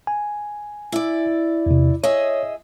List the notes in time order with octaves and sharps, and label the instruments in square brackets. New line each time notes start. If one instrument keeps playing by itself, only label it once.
[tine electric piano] G#5
[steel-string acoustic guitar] E4 D5
[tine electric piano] E2 C3
[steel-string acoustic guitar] G#4 D#5 E5 [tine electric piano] C#5